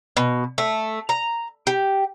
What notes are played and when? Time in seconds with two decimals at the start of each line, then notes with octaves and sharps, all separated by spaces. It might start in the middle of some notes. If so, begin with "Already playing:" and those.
0.17 B2
0.58 A3
1.09 A#5
1.67 G4